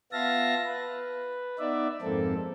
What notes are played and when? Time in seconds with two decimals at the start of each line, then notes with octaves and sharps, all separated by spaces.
0.12 B3 F4 E5 F5 A5 A#6
0.65 B4
1.59 B3 D#4 D5 E5
2.02 F2 G#2 A#3 C4 A4